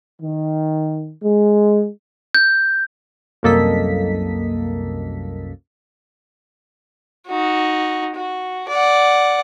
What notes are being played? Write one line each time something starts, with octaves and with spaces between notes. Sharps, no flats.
D#3
G#3
G6
C2 F#2 A#3 A4 D#5 B6
D#4 F#4
F#4
D5 F#5